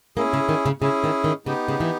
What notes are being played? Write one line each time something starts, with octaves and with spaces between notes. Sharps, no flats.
A#3 C#4 E4 G#4
C#3
D#3
C#3
C#3 C#4 E4 G#4
D#3
D#3
C#3 B3 D#4 G4
C#3
E3